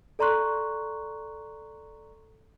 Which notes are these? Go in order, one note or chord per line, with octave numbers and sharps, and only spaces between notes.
A4 D5 A#5 C6 C#6 F#6